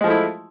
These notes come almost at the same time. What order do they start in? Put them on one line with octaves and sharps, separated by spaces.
G#3 F3 A3 E4